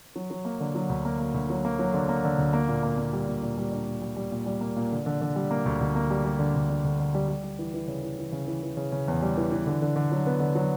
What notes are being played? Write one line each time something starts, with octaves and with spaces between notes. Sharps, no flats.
F#3
F#3
A#3
D3
F#3
D2
A#3
A#3
D2
F#3
A#3
F#3
D3
A#3
D3
D2
A#3
A#2
A#3
A#3
G3
A#2
A#2
G3
D4
A#2
G3
G3
A#2
G3
A#3
A#2
D3
D3
D3
G3
A#3
D2
D2
A#3
G3
G3
D3
D2
D3
D2
D3
G3
G3
G3
E3
E3
C#3
E3
E3
C#3
E3
E3
C#3
C#3
E2
G3
E3
E3
D3
D3
D3
F#3
B3
D3
F#3